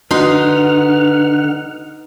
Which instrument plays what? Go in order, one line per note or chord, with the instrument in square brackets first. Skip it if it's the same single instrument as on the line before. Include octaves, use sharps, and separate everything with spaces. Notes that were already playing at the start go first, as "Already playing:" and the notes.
[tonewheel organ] D3 F#5 F6 [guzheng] D#4 C6 [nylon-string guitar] F#4 [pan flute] B4